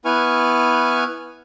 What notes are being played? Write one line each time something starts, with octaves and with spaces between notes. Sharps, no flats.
B3 E4 B4 G#5 C#6 F6